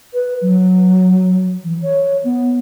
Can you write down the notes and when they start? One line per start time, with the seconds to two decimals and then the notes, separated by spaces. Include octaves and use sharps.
0.14 B4
0.41 F#3
1.63 E3
1.82 C#5
2.24 B3